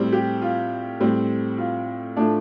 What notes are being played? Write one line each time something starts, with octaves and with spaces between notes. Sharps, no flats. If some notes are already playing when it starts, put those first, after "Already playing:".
Already playing: A2 G3 C4
G4
F4
A2 G3 C4
F4
A2 F3 A3 D4